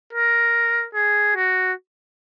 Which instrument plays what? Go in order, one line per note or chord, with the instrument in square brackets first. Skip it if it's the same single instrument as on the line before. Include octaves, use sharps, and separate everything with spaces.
[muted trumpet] A#4
G#4
F#4